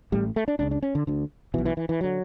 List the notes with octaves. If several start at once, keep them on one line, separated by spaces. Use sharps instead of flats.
A1 A2 G3
A3
D4
C#2 C#3 D4
D4
C#4
D3
D2 D3
B1 B2 E3
E3
E3
E3
D3 F#3